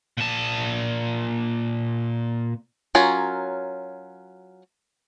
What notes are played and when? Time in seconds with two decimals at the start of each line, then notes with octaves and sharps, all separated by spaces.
0.17 A#2 A5
2.95 F#3 C#4 F4 A#4